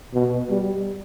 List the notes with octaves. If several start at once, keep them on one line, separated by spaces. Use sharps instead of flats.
B2
G3